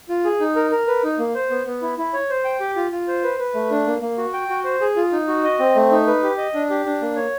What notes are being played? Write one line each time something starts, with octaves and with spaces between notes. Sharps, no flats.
F4
G#4
D#4
A#4
A#4
B4
D#4
A#3
C5
B3
B3
E4
E4
C#5
C5
G5
G4
F4
F4
C5
B4
B4
A3
D4
A#3
A#3
F#4
G5
F#4
C5
G#4
F4
D#4
F#4
D#5
C4
A3
D#4
B4
G4
D#5
D4
G4
D4
A#3
C#5